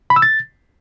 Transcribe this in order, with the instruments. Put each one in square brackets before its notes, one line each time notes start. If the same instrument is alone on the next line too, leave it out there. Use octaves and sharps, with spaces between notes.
[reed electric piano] B5
E6
A6